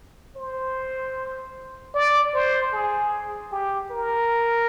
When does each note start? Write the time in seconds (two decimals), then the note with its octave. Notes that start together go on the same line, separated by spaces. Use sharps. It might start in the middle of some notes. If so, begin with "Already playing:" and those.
0.36 C5
1.95 D5
2.34 C5
2.73 G#4
3.52 G4
3.91 A#4